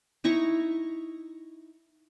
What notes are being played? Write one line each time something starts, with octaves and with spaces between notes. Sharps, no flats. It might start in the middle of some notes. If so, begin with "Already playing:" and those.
D#4 E4 A#5 C#6